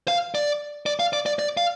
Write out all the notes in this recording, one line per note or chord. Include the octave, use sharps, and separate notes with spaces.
F5
D5
D5
F5
D5
D5
D5
F5